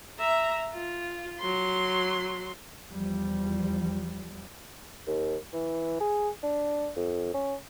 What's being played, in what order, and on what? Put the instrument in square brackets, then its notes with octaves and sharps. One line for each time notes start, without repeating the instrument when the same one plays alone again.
[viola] E5 A#5
F4
F#3 C6
[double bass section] E2 F3 G3
[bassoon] D#2
E3
G#4
D4
F2
C#4